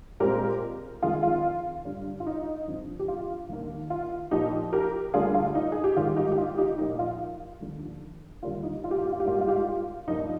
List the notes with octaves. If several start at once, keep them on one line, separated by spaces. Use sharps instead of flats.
A#2 G#3 C4 G4 A#4
F2 D#3 G#3 F4 G#4
F4
G2 D3 G3
F4
D#4
G2 D3 F3 C4
G4
F4
D#2 D#3 A#3
F4
A#2 F3 A#3 D#4 G4
G4 A#4
D2 D3 G3 A#3 F4 G#4
F4
D#4
G#4
G4
G#2 D#3 G3 F4
D#4 G4
G4
F4
D#4 G4
A#2 F3 A#3 D#4
F4
D#2 D3 F3
D#2 D3 G3 A#3 F4
D#4
F4
G4
F4
G4
F4
G4
G#2 G3 A#3 F4
G4
F4
G4
F4
G2 F3 A#3 D#4